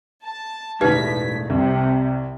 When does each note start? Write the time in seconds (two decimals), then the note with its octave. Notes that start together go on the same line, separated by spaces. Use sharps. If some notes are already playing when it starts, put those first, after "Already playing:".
0.22 A5
0.81 E1 A2 D#4 G4 B4 G#6 B6
1.50 C2 C3